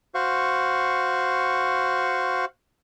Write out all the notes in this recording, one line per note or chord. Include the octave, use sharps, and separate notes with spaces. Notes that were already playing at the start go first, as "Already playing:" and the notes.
F#4 C5 F5 C#6